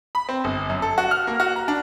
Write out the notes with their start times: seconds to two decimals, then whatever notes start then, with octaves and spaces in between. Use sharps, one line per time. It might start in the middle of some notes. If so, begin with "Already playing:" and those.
0.15 B5
0.29 C4
0.44 G1
0.70 F#2
0.82 A4
0.98 F#4
1.11 F6
1.27 A#3
1.40 F#4
1.56 A#5
1.68 D4